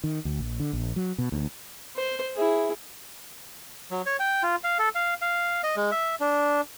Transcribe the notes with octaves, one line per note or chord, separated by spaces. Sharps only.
D#3
D2
A#1
D3
A#1
F#3
B2
D2
C5
E4 G#4
F#3
C#5
G5
F4
F5
A4
F5
F5
D#5
G#3
E5
D4